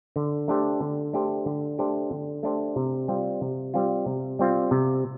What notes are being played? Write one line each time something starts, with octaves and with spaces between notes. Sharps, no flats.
D3
A3 D4 G4 C5
D3
A3 D4 G4 C5
D3
A3 D4 G4 C5
D3
A3 D4 G4 C5
C3
G3 C4 F4
C3
G3 C4 F4
C3
G3 C4 F4
C3